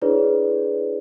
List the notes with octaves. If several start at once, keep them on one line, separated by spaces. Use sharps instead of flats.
D4 E4 G#4 B4 C#5 D5